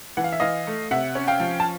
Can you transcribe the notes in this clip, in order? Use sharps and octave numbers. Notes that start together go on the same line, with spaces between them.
E3 F#5
F5
E5
E3 D#5 F5
A3
C3 E5 F#5
C#4
F5 G5
F3
A5